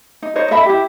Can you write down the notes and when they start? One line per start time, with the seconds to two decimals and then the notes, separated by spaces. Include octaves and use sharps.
0.22 D#4
0.35 D#4 C5 C#5 D#5
0.51 A4 D#5 E5 B5
0.66 E4 G4